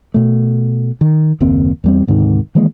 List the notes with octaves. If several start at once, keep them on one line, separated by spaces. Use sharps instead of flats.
B2 A3
D#3
F#1 D#2 A#3 C4
E2 G3 C4
D2 G#2 C3 D#3
D#3 E3 G#3 A#3